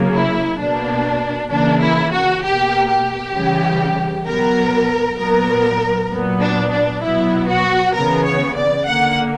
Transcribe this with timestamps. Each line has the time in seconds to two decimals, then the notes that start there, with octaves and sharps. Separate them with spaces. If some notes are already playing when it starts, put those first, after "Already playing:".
Already playing: C#3 F#3 A#3
0.13 E4
0.59 B2 A#3 D4
1.51 C#3 E3 A#3 D4
1.81 E4
2.12 F#4
2.42 B2 A#3 G4
2.89 G4
3.35 C#3 E3 G3
4.26 B2 F#3 B3 A#4
5.18 A#2 F#3 B3 A#4
6.11 A#2 F#3 B3
6.42 D4
6.72 D4
7.03 B2 F#3 B3 E4
7.49 F#4
7.94 C#3 E3 B3 A#4
8.25 C#5
8.55 D5
8.87 D3 A#3 F#5